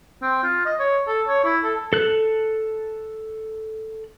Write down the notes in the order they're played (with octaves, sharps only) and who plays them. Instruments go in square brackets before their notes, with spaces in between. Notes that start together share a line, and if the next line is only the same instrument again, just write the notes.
[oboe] C4
F4
D#5
C#5
A4
C#5
E4
A4
[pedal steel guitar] A4 F#6